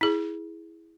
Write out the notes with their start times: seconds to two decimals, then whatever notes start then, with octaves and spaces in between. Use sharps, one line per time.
0.01 E4 G#4